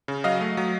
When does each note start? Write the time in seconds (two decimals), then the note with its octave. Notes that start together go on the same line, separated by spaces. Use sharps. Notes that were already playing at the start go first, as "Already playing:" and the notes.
0.08 C#3
0.24 F#3 D#5 F5
0.41 A3
0.57 F#3